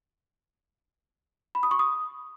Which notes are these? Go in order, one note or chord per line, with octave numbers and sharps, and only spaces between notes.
B5
D#6
C#6
D#6